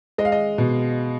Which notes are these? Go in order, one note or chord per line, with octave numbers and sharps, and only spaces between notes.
G#3 D#5
F5
D#5
B2